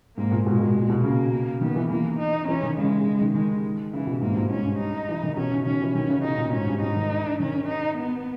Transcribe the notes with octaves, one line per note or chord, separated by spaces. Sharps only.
G#2 A#3
A#2
B2 G#3
A#2
A#2
B2
C#3 A#3
D#3 B3
E3
E3 A#3
D#4
E3 C#4
D#3
C#3 G#3
C#3
D#3
D#3 G#3
C#3 E3
B2
G#2 A#3
G2
G#2
G#2 C#4
G2
D#4
E3
D#3
B2 C#4
C#3
D#3 C#4
E3
D#3 C#4
C#3
B2 D#4
A#2
G#2 C#4
G2
G#2 D#4
D#3
D#3 C#4
D#4
B3